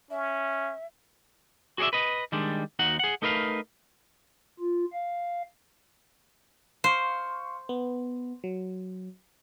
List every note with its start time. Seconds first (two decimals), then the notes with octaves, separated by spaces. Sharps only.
0.10 C#4 E5
1.78 F#4 G#4 C#5 D5 E5
1.93 B4 D#5
2.32 D#3 G3 G#3 D4
2.79 D#2 D#4 F#4 F#5
2.99 G#4 F#5
3.22 A3 D#4 A#4 B4 D#5 F5
4.59 F4
4.93 F5
6.84 C5 F5 C6 C#6
7.69 B3
8.44 F#3